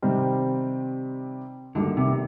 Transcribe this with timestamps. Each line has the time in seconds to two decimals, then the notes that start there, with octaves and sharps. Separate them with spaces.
0.02 C3 D#3 G3 C4 D#4
1.75 D2 G2 D3 D#3 G3 A#3
1.97 C2 C3